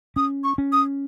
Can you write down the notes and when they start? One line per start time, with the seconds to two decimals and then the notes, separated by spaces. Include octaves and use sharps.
0.16 C#4 D#6
0.44 C#6
0.58 C#4
0.72 D#6